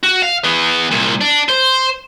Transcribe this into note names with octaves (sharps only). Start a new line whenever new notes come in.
F#4
F5
E3 B3
C2 A#2
D4
C5